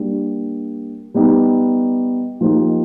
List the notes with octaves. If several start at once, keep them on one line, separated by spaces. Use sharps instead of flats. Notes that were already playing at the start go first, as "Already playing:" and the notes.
Already playing: G3 A#3 D4 G4
G3 B3 D#4 G4
F3 A#3 D#4 G4